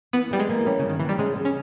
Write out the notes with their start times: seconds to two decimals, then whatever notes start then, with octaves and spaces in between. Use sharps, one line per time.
0.13 E3 B3
0.31 E3 G3
0.40 G#3
0.49 A#3
0.66 G3 C#4
0.80 G2 C#3
0.90 D#3
1.00 D#3 E3
1.09 G3
1.18 C#3 G#3
1.36 C#3
1.45 C#4